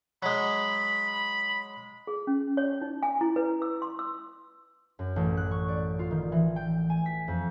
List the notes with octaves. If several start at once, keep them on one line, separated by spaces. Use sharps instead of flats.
F#3 G#3 B5
G#4
C#4
C#5
D#4
G#5
E4
B4
E6
C6
E6
F#2
A1
F#6
C#6
D5
F4
D#3
E3
G5
G#5
B6
F2